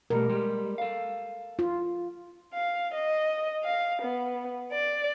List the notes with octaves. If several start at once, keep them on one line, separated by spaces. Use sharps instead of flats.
B2 G3 A3 A#4
G3 G#3 G4
A4 F5
F4
F5
D#5
F5
B3
D5